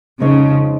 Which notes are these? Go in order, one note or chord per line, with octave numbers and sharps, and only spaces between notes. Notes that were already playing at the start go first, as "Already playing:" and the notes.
F2 C#3 F3 G#3 D#4 C#5